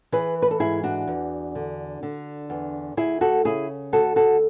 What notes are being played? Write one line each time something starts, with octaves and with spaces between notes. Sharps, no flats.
E3 G#4 B4
B4
A4
G#2 E4 G#4
D4 F#4
E2
D3
D3
E2
D2 E4 G#4
F#4 A4
C#3 E4 G#4
D2 F#4 A4
F#4 A4